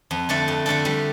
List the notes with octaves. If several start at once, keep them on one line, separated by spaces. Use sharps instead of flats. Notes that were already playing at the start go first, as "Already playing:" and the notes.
F2
D3 A3 D4 A4
F2
D3 A3 D4 A4
G3